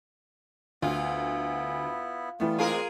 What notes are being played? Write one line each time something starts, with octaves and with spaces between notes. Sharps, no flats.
D2 B3 E4 F4
E3 G3 A3 B3 F4
G#3 A#3 C4 F4 G#4 A#4